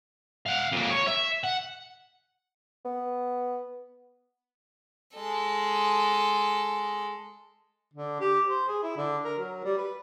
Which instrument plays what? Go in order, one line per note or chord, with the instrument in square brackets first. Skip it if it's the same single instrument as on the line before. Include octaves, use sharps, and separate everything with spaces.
[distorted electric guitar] F5 F#5
F2 A#3
C#5
E5
F#5
[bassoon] B3
[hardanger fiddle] G#3 A4
[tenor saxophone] D3
G4
C5
G#4
E4
D3
A#4
F#3
G3
B4